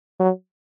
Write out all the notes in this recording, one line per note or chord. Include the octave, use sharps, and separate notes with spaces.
F#3